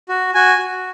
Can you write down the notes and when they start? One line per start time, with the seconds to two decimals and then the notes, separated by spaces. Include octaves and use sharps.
0.09 F#4
0.34 F#4 G#5
0.59 F#4